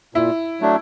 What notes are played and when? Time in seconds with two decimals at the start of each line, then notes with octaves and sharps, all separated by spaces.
0.15 A#2 E4
0.60 F#3 A3 D4